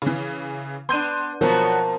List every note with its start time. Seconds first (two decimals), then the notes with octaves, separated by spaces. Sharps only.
0.02 C#3 E3
0.89 B3 D4 C6 G6 D#7
1.41 B2 F3 F#3 B3 F#4 A#4 C5 A5